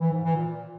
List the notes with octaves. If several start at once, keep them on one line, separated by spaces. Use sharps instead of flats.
E3
G#2
E3
A#2